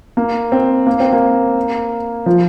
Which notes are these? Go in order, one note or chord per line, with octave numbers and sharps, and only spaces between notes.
A#3
C4
A#3
C4
A#3
F3